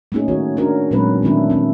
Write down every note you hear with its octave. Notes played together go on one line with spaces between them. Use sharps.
A3 A#3 C#4 D#4 G#4
D#3 F#4 C#5
C#4 D4 F#4 A#4
A#2 F#3 G#3 C4 C#4 B4
D#3 A3 C4 D4 E4
C4 E4